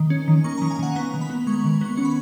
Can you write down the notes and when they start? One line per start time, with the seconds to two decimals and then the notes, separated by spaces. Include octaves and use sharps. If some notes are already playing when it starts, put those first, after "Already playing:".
Already playing: D#3
0.10 C#4
0.28 D#3
0.44 A#3 C#6
0.57 D#3 A#5
0.71 G#5
0.79 D#3 F#5
0.95 B3 A#5
1.13 D#3
1.21 B5
1.30 B3
1.47 G#3 C#6
1.64 D#3 C#6
1.81 B3 C#6
1.97 C#4 C#6
2.05 B5